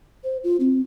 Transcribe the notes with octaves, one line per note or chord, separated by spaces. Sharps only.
C5
F4
C4